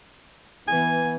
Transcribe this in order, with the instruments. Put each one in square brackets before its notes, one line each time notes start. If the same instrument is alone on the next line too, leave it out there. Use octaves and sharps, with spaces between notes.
[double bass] E3 B3 [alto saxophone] G#5